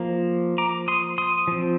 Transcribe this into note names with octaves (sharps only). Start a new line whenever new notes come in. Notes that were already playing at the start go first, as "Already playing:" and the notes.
Already playing: F3 A#3
A#5 D6
C6 D#6
C6 D#6
F3 C4